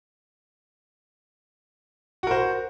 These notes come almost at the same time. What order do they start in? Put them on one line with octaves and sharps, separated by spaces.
F#4 A#4 C5